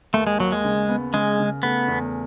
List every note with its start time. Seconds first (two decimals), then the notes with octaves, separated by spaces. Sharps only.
0.13 D#2 A3
0.27 G#3
0.38 D#2 F#3
0.52 G#3
0.64 C#3
0.89 B3
1.13 C#3 G#3
1.39 C#3
1.63 A3 B3
1.88 E2